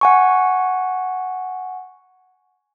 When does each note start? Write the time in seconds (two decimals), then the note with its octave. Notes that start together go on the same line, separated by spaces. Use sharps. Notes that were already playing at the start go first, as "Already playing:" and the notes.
0.01 F#5 G#5 C#6